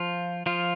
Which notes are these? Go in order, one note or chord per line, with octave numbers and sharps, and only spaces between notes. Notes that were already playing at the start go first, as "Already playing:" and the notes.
Already playing: F3 F4
F3 F4